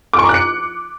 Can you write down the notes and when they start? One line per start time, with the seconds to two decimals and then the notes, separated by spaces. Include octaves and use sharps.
0.13 D6
0.19 C#6
0.24 A#5
0.29 F#6
0.34 C#7